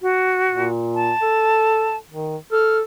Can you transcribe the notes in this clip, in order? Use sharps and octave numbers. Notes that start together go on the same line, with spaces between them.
F#4
A#2
A5
A4
D#3
A4 F6